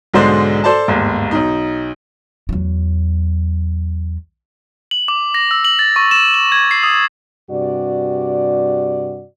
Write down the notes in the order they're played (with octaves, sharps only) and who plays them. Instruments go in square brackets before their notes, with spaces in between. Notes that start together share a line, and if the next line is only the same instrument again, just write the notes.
[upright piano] B1 G#2 D3 G#3 C5 D5
A4 C5 D5 A5
G1 D#2 G#2
B1 D#4
[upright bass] E2 F#3
[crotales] F#7
D6
A#6
E6
F#7
A6
C#6
E7
F#7
G#6
C7
D#6
[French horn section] G2 C3 F#4 D5